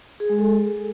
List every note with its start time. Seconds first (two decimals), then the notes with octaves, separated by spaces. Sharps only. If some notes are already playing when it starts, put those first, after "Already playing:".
0.20 G#4
0.29 G#3
0.39 A4